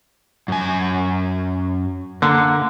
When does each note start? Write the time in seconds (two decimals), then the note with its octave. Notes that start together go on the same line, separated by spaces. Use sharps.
0.48 F#2 G#5
2.22 D3 A#3